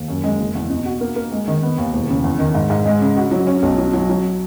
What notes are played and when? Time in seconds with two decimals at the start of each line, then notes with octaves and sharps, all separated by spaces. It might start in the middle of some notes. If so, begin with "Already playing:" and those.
Already playing: D#2
0.08 F#2
0.24 G#3
0.39 F#1
0.55 E2
0.70 B2
0.86 F#4
1.01 A#3
1.16 A#3
1.32 G#3
1.48 D#3
1.63 B3
1.78 D#2
1.93 E1
2.09 C#3
2.24 E2
2.39 D#3
2.55 G#2
2.70 G#2
2.86 G#3
3.01 C#3
3.16 F#4
3.31 F#3
3.47 C#4
3.62 B1
3.78 F#3
3.93 F#3
4.09 F#3